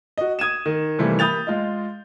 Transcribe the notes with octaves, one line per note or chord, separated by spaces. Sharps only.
F#4 D#5
D#6 G#6 D#7 E7
D#3
C3 D#3 E3 G3 A3 A#3
A#3 B5 D#6 G6 A6 F7
G#3 F4 D#5